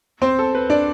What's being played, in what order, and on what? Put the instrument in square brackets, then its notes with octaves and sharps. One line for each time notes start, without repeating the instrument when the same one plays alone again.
[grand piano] C4 C5
A4
B4
D4 D5